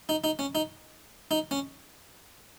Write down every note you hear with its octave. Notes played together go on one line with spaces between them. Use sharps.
D#4
D#4
C#4
D#4
D#4
C#4